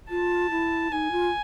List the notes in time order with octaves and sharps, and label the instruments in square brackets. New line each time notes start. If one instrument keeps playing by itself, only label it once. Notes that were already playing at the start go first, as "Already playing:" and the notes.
[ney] F4 [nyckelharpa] A5
[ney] E4
[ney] D#4 [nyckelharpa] G#5
[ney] F4